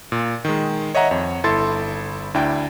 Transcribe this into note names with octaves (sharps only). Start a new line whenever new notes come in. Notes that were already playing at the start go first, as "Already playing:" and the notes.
A#2
D#3 G#3
C#5 D#5 E5 F#5 A#5
F2 C#5
G1 E4 A4 C6 A6
D2 D4 E4 G5